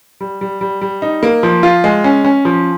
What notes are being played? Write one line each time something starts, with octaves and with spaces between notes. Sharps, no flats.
G3
G3
G3
G3
D#4
A#3
F3
F4
G#3
C#4
C#4
F3